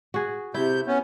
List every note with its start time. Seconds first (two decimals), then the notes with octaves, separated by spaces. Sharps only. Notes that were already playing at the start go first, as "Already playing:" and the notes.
0.14 F#4 G#4
0.54 C3 E4 G6
0.87 B3 C#4